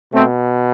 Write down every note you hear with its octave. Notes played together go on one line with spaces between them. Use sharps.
B2 A3 C4